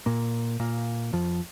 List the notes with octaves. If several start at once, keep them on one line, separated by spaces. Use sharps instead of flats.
A#2 A#3
A#2 A#3
F2 F3